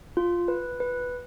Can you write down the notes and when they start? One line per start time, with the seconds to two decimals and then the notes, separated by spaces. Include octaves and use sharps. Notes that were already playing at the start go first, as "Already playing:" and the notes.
0.17 F4
0.48 B4
0.80 B4